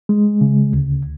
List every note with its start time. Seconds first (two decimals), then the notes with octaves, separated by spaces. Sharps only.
0.09 G#3
0.41 C#3
0.73 D2